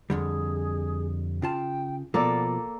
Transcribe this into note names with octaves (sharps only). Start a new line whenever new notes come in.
F2 D3 G3 G#4
C#3 F4 G5 A5
B2 F3 A#3 B3 A4 D5